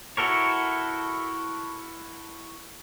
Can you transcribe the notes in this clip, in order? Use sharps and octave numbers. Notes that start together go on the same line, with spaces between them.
E4 F#4 A4 A#4 C#5